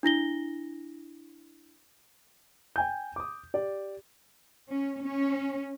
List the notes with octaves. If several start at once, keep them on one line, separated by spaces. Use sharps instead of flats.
D4 E4 A#6 G7
G5 G#5 G6
D6 D#6
G4 D5
C#4
C#4